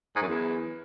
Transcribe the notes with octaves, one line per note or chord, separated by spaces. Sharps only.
G#2
F#2
E2